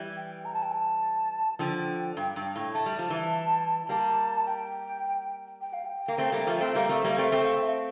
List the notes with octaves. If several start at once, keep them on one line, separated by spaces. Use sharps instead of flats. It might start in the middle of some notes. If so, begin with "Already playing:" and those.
Already playing: E3 G3
G5
A#5
A5
G5
A5
D3 F3 G5
G2
G2
A2
A3 A5
G3
F3
E3 G3
G3 A#3 A5
G5
G5
F5
G5
A#3
A3 C4
G3 A#3
F3 A3
A3 C4
G3 A#3 F5
A3 C4
G3 A#3
A3 C4
A3 C4 G5
F5
E5
F5